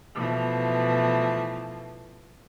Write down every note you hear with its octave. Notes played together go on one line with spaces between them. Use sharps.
B2 E3 F3 A3